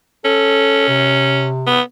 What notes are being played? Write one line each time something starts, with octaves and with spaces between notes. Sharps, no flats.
C#4 A4
C3
B3